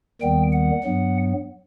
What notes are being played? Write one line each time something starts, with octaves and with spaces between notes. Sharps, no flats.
D#2 D#3 G3 B3 G5
F#5
G2 F#3 B3